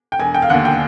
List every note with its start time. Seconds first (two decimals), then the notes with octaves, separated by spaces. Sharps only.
0.12 G5
0.20 E1 G#5
0.34 G5
0.42 F5
0.50 D#2 D3 F#5
0.65 G5